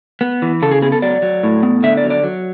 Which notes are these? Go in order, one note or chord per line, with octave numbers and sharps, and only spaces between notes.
B3
E3
C#3 A4
G#4
B3 G#4
A4
F#3 D5
F#3
A2
B3
D3 E5
D5
F#3
D5
F#3